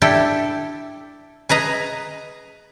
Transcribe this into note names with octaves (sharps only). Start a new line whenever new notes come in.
D4 E4 G4 A4
G#4 B4 D#5 A#5